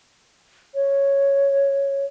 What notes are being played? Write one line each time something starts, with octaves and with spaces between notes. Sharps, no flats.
C#5